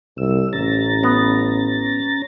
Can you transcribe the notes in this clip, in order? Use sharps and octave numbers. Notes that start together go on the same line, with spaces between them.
C2 E6
A1 C#4 A#5 A6
B3